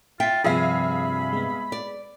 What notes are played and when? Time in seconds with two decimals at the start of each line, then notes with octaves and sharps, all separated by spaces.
0.20 F4 E5 G5
0.44 G2 C3 F3 G#4 E5 F5 B5
1.33 G#3 B3
1.72 D5